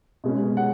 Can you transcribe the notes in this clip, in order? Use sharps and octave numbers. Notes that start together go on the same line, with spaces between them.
B2 G#3 C#4
F#5